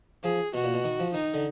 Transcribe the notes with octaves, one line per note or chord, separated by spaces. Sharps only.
F3 G#4
B2 F#4
A#2
B2
D#3
F3
D#3 D#4
D3